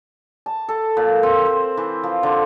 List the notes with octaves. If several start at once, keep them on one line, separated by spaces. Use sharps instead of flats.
A5
A4
A#2
C4
C5
E3
F3
D3